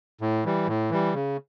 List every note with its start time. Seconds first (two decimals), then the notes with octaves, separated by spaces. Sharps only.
0.21 A2
0.45 E3 G3
0.67 A2
0.90 E3 G3
1.14 C#3